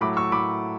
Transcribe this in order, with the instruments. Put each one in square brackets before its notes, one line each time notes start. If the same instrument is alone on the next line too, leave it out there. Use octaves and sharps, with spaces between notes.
[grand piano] A2 F#3 A3 B5 D6
C#6 E6
A2 B5 D6